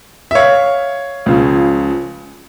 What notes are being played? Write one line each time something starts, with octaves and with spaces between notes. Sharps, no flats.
E5
C#5 F5
C#2 C#3 F3